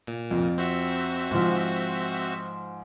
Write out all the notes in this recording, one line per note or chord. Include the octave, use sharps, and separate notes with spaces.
A#2
F2
C4 F#4 E5
G#2 F3